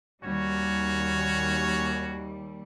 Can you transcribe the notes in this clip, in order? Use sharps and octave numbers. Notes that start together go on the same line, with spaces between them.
D#2 G3 C#4 F#4 C#5